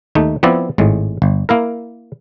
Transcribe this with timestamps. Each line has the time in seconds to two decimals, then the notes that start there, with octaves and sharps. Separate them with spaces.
0.15 D#2 A3 D#4
0.43 F3 B3 C4 E4 D5
0.78 G#1 A2 G#3
1.22 G1
1.49 A#3 E4 A#4